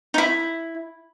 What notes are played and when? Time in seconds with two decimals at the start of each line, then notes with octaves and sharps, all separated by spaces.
0.14 D#4 E4